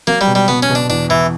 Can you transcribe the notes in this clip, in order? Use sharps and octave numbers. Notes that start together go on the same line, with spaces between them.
F#3 A#3
G3
B2
G3
B2 B3
C#4
B2
D4
E2 D4
E2 E3